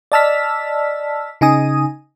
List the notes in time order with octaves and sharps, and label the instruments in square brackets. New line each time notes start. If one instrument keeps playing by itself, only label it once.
[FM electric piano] D5 D#5 A5 E6 F6 B6
C#3 D#4 G#5 D#6